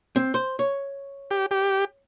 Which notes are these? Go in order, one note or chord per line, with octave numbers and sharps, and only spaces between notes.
C4
C5
C#5
G4
G4